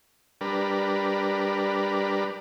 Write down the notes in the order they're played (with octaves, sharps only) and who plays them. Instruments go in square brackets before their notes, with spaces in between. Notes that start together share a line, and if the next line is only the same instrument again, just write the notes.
[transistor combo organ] G3 D4 A#4 B4